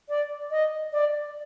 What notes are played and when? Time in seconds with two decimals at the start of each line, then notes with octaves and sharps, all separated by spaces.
0.09 D5
0.51 D#5
0.92 D5